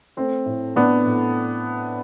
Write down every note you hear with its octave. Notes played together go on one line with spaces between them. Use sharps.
A3 C4
A2
A2 B3 D4
A2